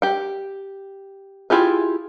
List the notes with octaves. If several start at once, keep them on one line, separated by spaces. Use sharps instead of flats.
G4 G5
E4 F4 G4 G#4